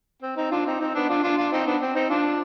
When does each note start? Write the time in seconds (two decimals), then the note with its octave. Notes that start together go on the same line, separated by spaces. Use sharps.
0.22 C4
0.37 C4 D#4
0.51 D4 F4
0.66 C4 D#4
0.80 C4 D#4
0.95 B3 D4
1.09 D4 F4
1.23 D4 F4
1.37 D4 F4
1.52 C4 D#4
1.66 B3 D4
1.81 C4
1.95 C4 D#4
2.09 D4 F4